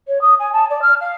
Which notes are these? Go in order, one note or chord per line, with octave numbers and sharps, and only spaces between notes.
C#5
D#6
G#5
A5
D5
F6
F5